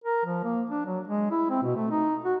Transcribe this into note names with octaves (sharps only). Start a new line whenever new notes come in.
A#4
F3
A#3
D4
F#3
G#3
E4
C4
B2
A3
D#4
F#4